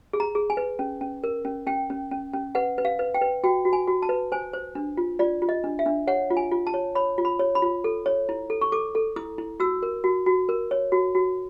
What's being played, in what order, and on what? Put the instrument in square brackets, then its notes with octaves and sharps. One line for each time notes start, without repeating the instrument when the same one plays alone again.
[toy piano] G#4
A#5
G#4
G#5
B4
C#4
C#4
A#4
C#4
C#4 G5
C#4
C#4
C#4
B4 F#5
B4
F5
B4
G5
B4
F#4 G5
F#4
G#5
F#4
A5
B4
C5 G#5
C5
D4
F4
F4 D5
F4
D#5
D4
E5
D4
C#5 F#5
F4
G#5
F4
A5
C#5
C#5 B5
F4
B5
C#5
B5
F4
A4
C#5
E4
A4
C#6
A4 D6
A4
E4 D#6
E4
F#4 E6
A#4
F#4
F#4
A#4
C#5
F#4
F#4